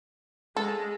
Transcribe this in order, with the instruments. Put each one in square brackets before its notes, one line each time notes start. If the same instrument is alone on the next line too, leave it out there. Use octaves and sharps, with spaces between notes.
[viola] G#3 [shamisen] A4